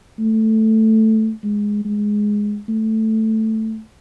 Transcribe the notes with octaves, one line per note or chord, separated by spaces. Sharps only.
A3
G#3
G#3
A3